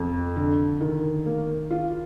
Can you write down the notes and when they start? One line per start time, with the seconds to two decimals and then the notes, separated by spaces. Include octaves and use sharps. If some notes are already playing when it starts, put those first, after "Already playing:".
Already playing: F2
0.36 D3
0.81 D#3
1.26 A#3
1.71 F4